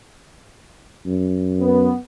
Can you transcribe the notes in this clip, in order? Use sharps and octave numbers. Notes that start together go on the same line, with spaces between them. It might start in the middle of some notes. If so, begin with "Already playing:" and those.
F#2
B3